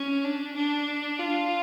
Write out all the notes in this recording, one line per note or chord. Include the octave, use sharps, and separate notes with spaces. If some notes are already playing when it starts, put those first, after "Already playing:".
Already playing: C#4
D4
D4
F4